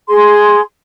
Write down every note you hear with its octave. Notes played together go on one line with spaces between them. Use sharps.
G#4 C6